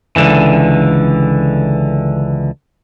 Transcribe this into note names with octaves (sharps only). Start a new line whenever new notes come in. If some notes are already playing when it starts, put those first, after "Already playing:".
C#2 D3 E3